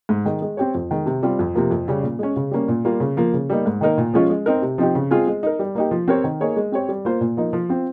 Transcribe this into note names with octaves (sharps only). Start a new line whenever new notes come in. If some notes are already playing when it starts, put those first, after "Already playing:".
G#2
D#3 G#3
G#3
C4 G4 C#5
F2
D#3 G#3
C3
G3 C4 F4
F2
C3 F3 A#3
F2
C#3 G3 C#4
A#2
G#3 C#4
C#3
G3 A#3 C#4
A#2
G3 A#3 F4
C#3
F3 A#3
C#3
G3 A#3 D#4
G#2
D#3 A#3 D#4 A#4
A#2
F3 G#3 C#4 F4
G#3
C4 D#4 A#4
C3
F3 C4 D#4 G4
C#3
G#3 C4 F4 G#4
G#3
D#4 A#4
G3
A#3 D#4 G4
F3
C4 G4 A#4 C#5
D#3
A#3 D#4 G#4 C#5
G#3
C4 G4 C#5
G3
A#3 F4 C5
A#2
F3 A#3 D#4
F3
C4 F4